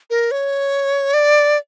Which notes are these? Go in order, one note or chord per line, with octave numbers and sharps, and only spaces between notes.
A#4
C#5
D5